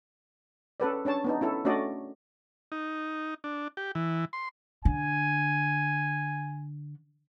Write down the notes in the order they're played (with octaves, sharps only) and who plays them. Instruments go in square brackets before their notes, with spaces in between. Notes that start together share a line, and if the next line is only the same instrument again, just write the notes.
[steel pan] C#4 A4 B4 D5
C#4 D4 C#5 A5
B3 D4 D#4
C#4 E4 A4
A3 C#4 D4 F#4 D5 D#5
[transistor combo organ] D#4
D4
G4
E3
C6
[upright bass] D3 [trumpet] G#5